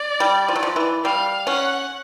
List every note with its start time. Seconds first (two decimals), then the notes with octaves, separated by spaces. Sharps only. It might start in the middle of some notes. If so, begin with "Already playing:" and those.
Already playing: D5
0.20 G3
0.48 F3
0.56 F#3
0.63 F3
0.76 E3
1.05 G3 F5
1.47 C#4 F#5